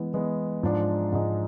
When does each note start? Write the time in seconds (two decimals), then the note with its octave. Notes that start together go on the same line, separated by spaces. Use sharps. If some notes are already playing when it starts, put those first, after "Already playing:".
Already playing: E3 G#3 B3
0.13 E3 G#3 B3
0.63 G#2 F3 G#3 D4
1.12 G#2 F3 G#3 D4